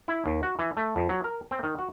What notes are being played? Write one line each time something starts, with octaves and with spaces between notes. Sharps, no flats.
E4
D#2
F#4
E3
A3
F2
F#3
A#4
C4
D#3
F#4